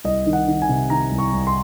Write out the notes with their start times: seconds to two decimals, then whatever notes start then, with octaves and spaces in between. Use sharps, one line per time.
0.04 C2 D#5
0.26 D#3
0.33 F#5
0.48 D#3
0.62 G#5
0.69 C3
0.90 D#3 A#5
1.12 C2
1.18 C#6
1.33 C2
1.47 C6